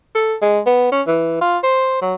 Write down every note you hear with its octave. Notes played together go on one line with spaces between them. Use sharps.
A4
G#3
B3
C#4
E3
F4
C5
F#3